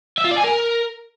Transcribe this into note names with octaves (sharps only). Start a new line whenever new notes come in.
E5
F4
D5
G#5
A#4